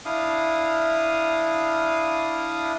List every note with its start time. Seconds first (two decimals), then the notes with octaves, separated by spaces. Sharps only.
0.05 D4 E4 F5 D#6